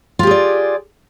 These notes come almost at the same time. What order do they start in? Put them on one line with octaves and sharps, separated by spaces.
F4 G4 G#4 D5